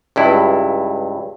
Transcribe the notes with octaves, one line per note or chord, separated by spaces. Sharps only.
C#2 G2 E4